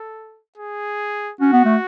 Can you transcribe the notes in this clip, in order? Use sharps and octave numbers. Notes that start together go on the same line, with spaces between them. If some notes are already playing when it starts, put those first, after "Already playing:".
Already playing: A4
G#4
C#4 F#4
B3
A3